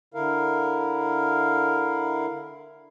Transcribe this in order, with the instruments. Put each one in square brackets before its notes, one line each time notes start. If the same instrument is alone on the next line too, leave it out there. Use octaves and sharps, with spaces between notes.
[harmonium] D3 E4 A#4 F5